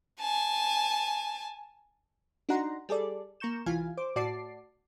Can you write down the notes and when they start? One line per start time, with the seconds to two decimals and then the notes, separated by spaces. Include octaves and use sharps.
0.20 G#5 A5
2.49 D4 D#4 F#4 F#5 A#5 C6
2.89 G3 G#4 A4 D5
3.40 A#3 A#5 C#6 G6 E7
3.66 C2 E3 F4 F5 G#5
3.97 C5 D6
4.16 A2 F#4 D5 A5 D6 C7